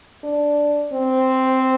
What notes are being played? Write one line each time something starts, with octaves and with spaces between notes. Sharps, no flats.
D4
C4